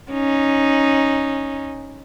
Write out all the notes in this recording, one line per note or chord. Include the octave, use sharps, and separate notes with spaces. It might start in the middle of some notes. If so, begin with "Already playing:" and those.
C#4 D#4